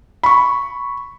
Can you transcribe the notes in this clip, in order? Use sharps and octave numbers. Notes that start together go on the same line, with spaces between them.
B5 C#6